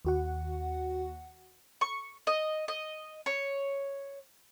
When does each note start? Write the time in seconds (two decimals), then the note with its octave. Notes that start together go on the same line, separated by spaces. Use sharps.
0.05 D#2 F#4 F#5
1.81 C#6
2.27 D#5
2.68 D#5
3.26 C#5